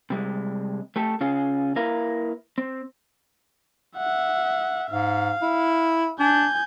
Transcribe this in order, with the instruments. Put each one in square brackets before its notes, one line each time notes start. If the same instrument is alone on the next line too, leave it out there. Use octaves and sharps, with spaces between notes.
[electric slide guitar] C3 G3 G#3
A3 G4 A4
C#3 C#4 F4 G#4
A#3 E4 A#4 B4 F5
C4
[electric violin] E5 F#5
[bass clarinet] G#2 [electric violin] F5
[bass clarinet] E4
[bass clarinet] D4 [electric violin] G#5 G6